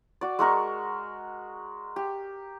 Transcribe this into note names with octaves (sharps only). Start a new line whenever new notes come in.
F#4 D5
G#3 F#4 A#4 C#6
G4